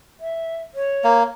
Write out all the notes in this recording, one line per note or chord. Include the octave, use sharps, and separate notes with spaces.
E5
C#5
A#3